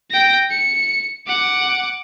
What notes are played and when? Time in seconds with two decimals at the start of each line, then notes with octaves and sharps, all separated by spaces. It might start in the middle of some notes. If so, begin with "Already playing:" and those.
0.11 G5 A#6
0.51 C#7
1.27 F#5 D6